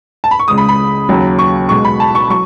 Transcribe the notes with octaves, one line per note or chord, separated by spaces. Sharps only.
A5
B5
C#6
C#2 C#3 G#3 D#6
B5
B5
D#2 C#3 F#3
C#6
B1 B2 G#3 C#6
B5
A5
C#6
F#3 C#6